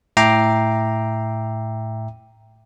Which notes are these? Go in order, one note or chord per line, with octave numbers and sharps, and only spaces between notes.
A2 E5 G5 A#5 D6 C7